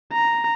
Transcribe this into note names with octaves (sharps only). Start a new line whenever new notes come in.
A#5